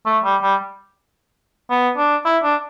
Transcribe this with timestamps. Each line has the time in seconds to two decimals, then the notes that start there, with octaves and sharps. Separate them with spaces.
0.06 A3
0.24 G3
0.42 G3
1.70 B3
1.97 D4
2.25 E4
2.43 D4